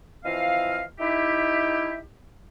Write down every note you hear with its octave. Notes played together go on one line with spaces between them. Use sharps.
E3 F3 C4 D#5 F5
D#4 E4 G4 E5